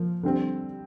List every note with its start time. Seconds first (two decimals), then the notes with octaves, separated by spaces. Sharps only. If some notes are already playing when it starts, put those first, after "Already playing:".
Already playing: F3 A#3
0.23 D3 G3 C4